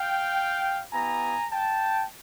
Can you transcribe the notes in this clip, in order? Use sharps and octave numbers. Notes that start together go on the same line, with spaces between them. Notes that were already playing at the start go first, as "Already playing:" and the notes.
Already playing: F5 G5
B3 E4 G4 G#5 A#5
G5 A5